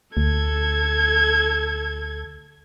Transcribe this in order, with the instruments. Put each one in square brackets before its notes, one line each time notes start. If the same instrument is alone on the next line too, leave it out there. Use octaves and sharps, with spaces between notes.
[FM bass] D2 [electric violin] A4 G#6